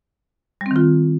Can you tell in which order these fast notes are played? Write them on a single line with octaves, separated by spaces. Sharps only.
G3 C4 D#3 F4